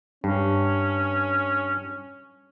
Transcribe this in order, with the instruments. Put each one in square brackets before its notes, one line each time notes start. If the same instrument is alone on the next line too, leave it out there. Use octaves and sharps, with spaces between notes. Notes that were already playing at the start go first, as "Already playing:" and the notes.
[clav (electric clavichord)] G2 [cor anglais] C#4